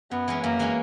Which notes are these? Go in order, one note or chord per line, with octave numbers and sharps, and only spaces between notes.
F#2 B3
E3 G#3 C#4
F#2 A#3
E3 G#3 C#4